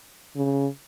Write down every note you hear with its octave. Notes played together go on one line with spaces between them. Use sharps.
C#3